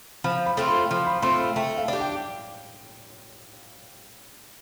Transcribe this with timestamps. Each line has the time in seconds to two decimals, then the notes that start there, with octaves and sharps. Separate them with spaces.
0.24 F3 B5
0.46 B5
0.57 A3 C4 F4
0.68 B5
0.90 F3 C6
1.07 B5
1.22 A3 C4 F4 C6
1.40 B5
1.56 A3 G5
1.78 F5
1.88 D4 G4
2.00 G5